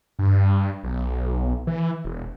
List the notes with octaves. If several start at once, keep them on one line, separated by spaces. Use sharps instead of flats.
G2
B1
E3
E1